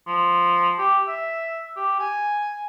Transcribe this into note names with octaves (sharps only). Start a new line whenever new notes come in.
F3
G4
E5
G4
G#5